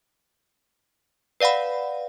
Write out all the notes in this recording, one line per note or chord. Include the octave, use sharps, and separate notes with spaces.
B4 D5 F5 F#5 B5